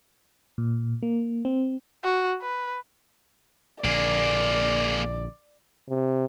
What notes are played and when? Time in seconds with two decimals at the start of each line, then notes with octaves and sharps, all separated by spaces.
0.58 A#2
1.03 A#3
1.45 C4
2.03 F#4
2.42 B4
3.84 A#1 D3 A#3 G#4 D5
5.89 C3